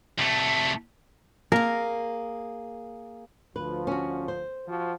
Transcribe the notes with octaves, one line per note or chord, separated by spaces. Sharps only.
C2 A3
A#3 G#4 A#4
D2 F3 B4
C#4 F#4
C5
F3 F#4